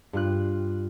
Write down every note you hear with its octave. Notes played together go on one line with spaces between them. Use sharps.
G2 F4 F#6